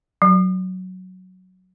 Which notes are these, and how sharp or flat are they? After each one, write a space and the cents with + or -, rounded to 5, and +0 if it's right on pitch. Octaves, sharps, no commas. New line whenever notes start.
F#3 +0